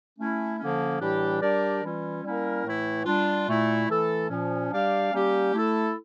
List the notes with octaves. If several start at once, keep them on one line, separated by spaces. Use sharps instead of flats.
A3 C#4 E4
D3 F3 A#3 C#4
A2 E3 G3 D4 G4
G3 D4 G4 A#4 D5
E3 G3 C#4 F4
G3 A#3 C#4 E4 A#4
A2 E3 A3 E4
G3 D4 F4
A#2 A3 E4
E3 A3 E4 A4
A#2 F3 C#4
G3 D4 G4 D5 F5
G3 A#3 C#4 G4
A3 E4 A4